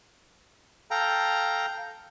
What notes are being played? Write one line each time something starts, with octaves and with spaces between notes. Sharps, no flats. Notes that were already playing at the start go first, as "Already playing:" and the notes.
A4 F5 G5 A#5